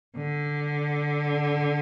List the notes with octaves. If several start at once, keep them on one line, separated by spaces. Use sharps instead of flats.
D3